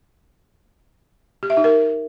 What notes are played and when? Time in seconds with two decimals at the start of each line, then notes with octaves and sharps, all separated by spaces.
1.43 G4
1.50 E5
1.57 D#4
1.64 A#4